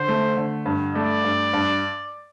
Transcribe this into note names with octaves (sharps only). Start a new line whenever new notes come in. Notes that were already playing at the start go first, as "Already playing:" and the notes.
Already playing: D3 C5
A3
D3
G2
A3 D5
G2
G2